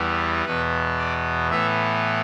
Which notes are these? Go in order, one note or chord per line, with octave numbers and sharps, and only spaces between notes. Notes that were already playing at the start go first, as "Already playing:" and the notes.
Already playing: E2 E3 G3 B3
E2 B2 B3 B4
D5
A2 E3 B3 E5